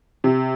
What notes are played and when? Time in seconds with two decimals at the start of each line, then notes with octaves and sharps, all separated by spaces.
0.24 C3